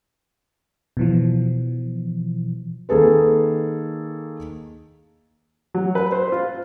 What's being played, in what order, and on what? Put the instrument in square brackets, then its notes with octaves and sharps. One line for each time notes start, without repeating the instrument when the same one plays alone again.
[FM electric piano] B2 E3 F3
[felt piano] D#3 A#3 G#4 A4 B4
[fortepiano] F#3
B4
C5
F4